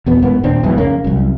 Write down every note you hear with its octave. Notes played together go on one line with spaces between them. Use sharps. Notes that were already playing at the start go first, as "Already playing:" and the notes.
E2 B2 B3
A1 G#2 A#3 B3
D#2 A#2 C4 D4
B1 F2 G#2 E3
F2 C#3 A#3 C#4
C2 F#2